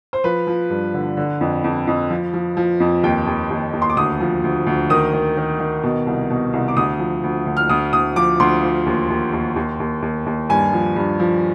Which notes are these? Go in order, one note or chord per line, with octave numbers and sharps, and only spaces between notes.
C5
F3 B4
F3
G2
D3
D3
F2
F2
F2
F3
F3
F3
F2
D#2 G5
D#2
D#2
D#2
C6
D6
D2 D#6
F3
D2
D2
D#3 D#6
D#3
D#3
D#3
B2
C2
B2
C2
D6
D2 D#6
F3
D2
D2
F6
D2 D#6
D2 D#6
F3 D6
D2 C6
F3
D#2
D#2
D#2
D#2
D#2
D#2
D#2
G2 G#5
F3
G2
F3